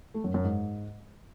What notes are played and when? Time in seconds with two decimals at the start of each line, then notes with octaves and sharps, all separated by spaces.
0.14 A3
0.24 F#2
0.34 F#2
0.44 G#2